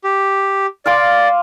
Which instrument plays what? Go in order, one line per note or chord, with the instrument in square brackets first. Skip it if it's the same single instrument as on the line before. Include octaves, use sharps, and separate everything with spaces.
[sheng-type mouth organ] G4
[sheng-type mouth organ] D5 [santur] F5 C6 D6